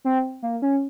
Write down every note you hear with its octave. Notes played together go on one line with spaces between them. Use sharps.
C4
A#3
C#4